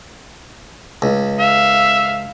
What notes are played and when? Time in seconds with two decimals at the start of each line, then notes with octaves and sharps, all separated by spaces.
1.02 C#2
1.39 E5 F5